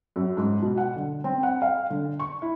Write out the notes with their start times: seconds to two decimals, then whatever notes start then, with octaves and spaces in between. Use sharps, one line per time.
0.16 F#2
0.37 G#2
0.62 B2
0.77 F#5
0.96 D3
1.24 C4
1.43 F#5
1.62 F5
1.90 D3
2.20 C#6
2.42 E4